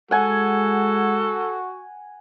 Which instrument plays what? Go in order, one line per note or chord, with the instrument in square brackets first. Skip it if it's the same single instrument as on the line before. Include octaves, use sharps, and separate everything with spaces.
[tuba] G#3 [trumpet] F#4 [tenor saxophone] A4 [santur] F#5 G#5